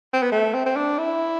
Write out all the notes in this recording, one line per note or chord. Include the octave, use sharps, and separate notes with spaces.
C4
B3
A3
C4
C4
D4
E4